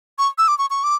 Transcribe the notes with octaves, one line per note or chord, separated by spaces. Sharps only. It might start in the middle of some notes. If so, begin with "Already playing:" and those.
C#6
E6
D6
C#6
C#6
D6